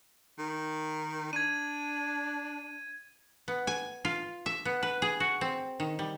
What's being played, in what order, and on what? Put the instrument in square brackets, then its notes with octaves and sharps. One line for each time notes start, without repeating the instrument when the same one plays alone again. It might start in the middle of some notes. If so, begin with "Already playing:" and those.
[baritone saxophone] D#3
[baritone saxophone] D4 [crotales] G#6 D#7
[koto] B3
G#5
F4
E5
B3
B4
G#4
F#4
C4
D#3
G3